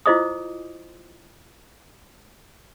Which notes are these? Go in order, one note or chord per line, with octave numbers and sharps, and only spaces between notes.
E4 F4 C5 D#5 D6 D#6